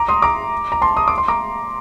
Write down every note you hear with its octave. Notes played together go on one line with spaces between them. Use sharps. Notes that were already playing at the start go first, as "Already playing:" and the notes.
Already playing: A#5 D6
C6 D#6
A#5 D6
A#5
A5 C6
D#6
D6
C6
A#5 D6